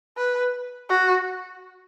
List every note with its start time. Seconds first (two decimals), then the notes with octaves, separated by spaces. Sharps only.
0.17 B4
0.89 F#4